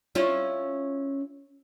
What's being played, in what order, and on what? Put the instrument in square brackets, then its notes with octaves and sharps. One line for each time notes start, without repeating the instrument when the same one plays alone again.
[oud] C#4 E4 F4